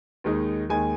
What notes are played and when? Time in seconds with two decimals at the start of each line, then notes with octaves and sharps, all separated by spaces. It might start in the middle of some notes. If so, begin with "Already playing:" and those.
0.24 D#2 D#3 G#3 D#4
0.69 D#2 D#3 G#3 D#4 G#5